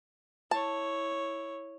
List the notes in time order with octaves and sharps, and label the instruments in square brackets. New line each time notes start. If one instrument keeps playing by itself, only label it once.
[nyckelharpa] E4 C#5 [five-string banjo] A5